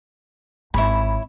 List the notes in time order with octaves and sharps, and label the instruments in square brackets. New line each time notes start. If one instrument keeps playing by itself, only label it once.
[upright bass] G#1 [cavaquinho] E4 C#5 B5